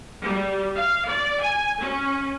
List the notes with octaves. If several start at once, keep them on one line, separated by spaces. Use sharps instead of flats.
G3
F5
D5
G#5
C#4